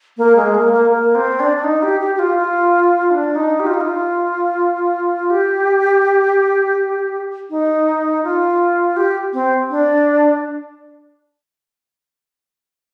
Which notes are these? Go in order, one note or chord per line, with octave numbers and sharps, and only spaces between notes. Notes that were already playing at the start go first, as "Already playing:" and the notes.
A#3
G#3
A#3
A#3
A#3
C4
D4
D4
D#4
G4
G4
G4
F4
F4
D4
D#4
G4
F4
D#4
F4
G4
D#4
F4
G4
C4
D4